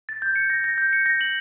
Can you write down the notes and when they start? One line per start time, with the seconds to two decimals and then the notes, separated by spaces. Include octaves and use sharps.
0.09 A6
0.22 G6
0.36 C#7
0.50 A#6
0.64 A#6
0.78 G6
0.93 C#7
1.06 A#6
1.21 F#7